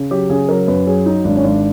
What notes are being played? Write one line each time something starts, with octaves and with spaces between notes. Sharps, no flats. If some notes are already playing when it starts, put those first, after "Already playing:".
Already playing: C#3
F#3 G4
C#3 G#4
F#3 A#4
F#2 B4
F#3 G#4
F#3 D#4
G#1 D4
C#4
G#1 D4